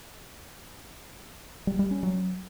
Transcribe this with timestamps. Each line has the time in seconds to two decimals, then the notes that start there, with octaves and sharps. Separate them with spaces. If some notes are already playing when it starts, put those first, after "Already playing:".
1.67 G3
1.79 G3
1.91 C#4
2.03 F#3